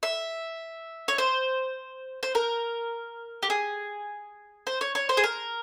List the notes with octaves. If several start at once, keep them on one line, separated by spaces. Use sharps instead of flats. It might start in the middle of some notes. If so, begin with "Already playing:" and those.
E5
C#5
C5
C5
A#4
G4
G#4
C5
C#5
C#5
C5
G#4
A#4